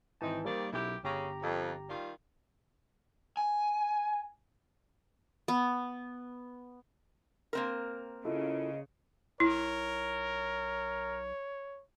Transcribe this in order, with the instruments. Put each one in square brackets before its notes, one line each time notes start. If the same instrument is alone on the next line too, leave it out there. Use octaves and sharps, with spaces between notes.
[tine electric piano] G#1 E3 A5 [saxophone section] C4 D#4
[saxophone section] D#3 C4 D5 [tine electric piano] G3 A#3
[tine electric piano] B1 [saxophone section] F#2 E4 G4
[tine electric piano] G1 G4 A#5 [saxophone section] C#3
[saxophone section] F2
D#3 G3 F4
[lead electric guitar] G#5
[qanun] B3
[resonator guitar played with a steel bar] A#3 C4 A#4
[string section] C#3 [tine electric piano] E4 F4 A4 [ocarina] D#5
[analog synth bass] B1 [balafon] E4 [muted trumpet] A#4 [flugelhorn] C#5